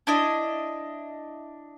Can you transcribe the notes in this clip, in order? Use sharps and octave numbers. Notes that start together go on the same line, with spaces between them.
D4 E4 D#5